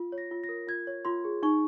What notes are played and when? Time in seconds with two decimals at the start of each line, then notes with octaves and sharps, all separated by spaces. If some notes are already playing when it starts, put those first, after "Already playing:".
Already playing: F4
0.12 C#5
0.18 A#6
0.31 F4
0.44 A#6
0.49 A#4
0.67 F4 G#6
0.87 C#5
1.05 F4 C6
1.24 G#4
1.43 D#4 C#6